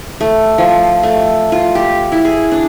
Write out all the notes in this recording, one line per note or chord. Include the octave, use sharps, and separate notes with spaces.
A3
F3
A3
F4
G4
E4
G#4
D4